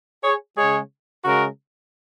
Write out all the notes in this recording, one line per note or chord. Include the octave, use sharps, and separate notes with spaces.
G#4 C#5
C#3 G#3 G#4 C#5
C#3 G#3 F#4 A#4